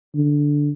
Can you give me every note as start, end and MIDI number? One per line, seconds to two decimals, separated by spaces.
0.15 0.70 50